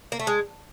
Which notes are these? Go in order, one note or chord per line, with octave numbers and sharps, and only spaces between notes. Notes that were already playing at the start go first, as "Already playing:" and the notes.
A#3
A3
G#3